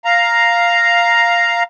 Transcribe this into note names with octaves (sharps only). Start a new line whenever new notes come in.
F5 A#5